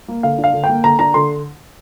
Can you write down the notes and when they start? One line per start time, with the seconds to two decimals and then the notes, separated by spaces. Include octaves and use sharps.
0.08 A#3
0.23 D3 F5
0.38 D4
0.44 F5
0.53 D3
0.64 G5
0.69 A#3
0.84 D3 A#5
0.99 D4 A#5
1.14 D3 C6